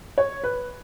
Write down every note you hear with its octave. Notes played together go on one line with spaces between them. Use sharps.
C#5
B4